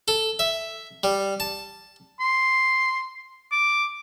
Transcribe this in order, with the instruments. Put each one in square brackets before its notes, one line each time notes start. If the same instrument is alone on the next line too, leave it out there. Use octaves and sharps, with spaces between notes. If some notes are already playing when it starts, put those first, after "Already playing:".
[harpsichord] A4
E5
G3
A5
[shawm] C6
D6